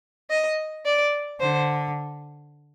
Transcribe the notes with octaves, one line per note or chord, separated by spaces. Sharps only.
D#5
D5
D3 C5